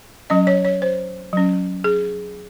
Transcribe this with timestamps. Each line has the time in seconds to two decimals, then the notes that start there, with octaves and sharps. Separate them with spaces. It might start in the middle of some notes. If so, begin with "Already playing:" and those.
0.30 F#3 C#4 D#5
0.47 C#5
0.65 C#5
0.82 C5
1.33 F#3 C#4
1.84 G#4